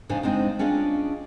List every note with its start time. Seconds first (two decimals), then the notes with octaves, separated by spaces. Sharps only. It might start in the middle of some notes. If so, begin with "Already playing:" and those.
0.09 F2 A2 C#3 D4 D#4 G#5
0.23 G#3 C4 D4 D#4
0.59 C#4 D4 F4 G#4 D#5